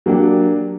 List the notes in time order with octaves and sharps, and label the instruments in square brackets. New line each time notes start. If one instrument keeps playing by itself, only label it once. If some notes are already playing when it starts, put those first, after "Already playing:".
[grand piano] F#3 A#3 D4 G4